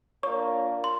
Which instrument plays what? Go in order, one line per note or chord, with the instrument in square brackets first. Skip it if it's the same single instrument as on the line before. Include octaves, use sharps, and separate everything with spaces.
[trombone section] A#3 D4 F4 A#4 [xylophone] C#5 C#6
[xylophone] C6